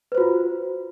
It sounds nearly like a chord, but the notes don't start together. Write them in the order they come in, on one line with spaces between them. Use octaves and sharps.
B4 C5 F#4 F4